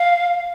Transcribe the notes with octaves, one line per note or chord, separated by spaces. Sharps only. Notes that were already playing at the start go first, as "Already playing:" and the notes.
Already playing: F5